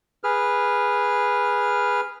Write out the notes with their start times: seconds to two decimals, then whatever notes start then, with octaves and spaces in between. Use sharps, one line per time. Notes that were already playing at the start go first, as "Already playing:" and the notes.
0.24 G#4 B4 F6